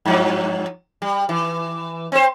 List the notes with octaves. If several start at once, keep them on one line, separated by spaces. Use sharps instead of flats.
G2 F3 F#3
G3
E3
C4 C5